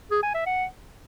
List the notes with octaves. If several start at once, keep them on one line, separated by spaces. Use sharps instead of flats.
G#4
G#5
E5
F#5